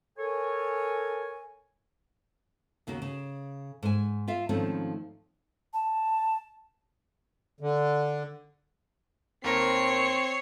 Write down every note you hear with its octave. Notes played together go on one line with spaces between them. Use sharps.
A4 A#4 C#5 G#5
D#2 C#3 A#3 F#4
C#3
G#2 G#5
F4 E5 F5
G#2 D#3 F3 A3 C4 C#4
A5
D3
D#2 C4 A#4 C#5 A#6 C7